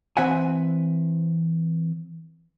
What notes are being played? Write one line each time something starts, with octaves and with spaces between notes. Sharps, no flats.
E3 C4 E5 F#5 G#5